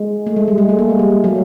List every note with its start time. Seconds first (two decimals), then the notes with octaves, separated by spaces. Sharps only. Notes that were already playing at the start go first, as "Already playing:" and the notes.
Already playing: G#3
0.27 A3
0.36 G#3
0.48 G3
0.58 G#3
0.69 A3
0.79 A#3
0.89 G#3
0.99 G3
1.24 F#3